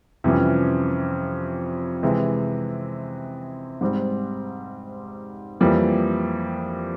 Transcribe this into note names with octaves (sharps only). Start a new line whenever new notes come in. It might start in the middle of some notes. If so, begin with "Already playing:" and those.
F2 C3 E3 G3 C#4
C3 E3 G#3
G#2 G3 C4
F2 E3 G3 A#3